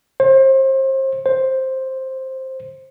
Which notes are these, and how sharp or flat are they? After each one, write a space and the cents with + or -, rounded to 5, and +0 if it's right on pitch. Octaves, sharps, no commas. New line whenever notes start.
C5 +35
C5 +10